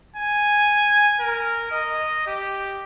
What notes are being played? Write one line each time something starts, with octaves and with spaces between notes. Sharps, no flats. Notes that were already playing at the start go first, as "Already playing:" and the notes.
G#5
A#4
D#5
G4